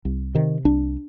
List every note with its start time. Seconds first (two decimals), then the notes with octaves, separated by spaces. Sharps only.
0.05 C2
0.35 C3 D#3
0.65 C2 D4